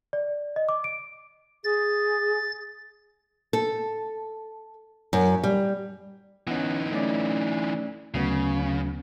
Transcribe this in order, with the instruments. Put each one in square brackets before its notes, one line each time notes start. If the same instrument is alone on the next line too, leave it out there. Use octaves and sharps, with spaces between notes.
[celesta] D5
D#5
D6
D7
[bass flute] G#4 [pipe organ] A6
[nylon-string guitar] A4
F#2
G3
[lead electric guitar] E3 D#4 [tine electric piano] B3 C#4
[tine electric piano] A3 C#4 D5
[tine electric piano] D2 F#3 B3 [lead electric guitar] C#3